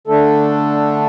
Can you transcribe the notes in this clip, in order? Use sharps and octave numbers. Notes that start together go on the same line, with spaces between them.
D3 A3 D4 A4